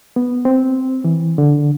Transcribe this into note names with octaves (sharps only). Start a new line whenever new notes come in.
B3
C4
E3
D3